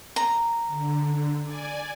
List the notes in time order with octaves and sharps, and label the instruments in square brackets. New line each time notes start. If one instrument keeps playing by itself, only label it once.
[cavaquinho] A#5
[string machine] D3
D5 G#5